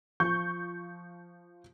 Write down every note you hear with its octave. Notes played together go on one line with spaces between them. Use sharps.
F3 C#6 G6